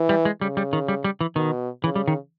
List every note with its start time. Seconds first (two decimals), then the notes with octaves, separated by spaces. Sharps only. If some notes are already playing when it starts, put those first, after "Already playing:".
Already playing: E3
0.09 G3
0.25 G#3
0.41 C#3 G3
0.57 G3
0.73 D#3
0.88 G3
1.04 G3
1.21 E3
1.36 B2 D#3
1.84 C#3 E3
1.96 G3
2.08 D#3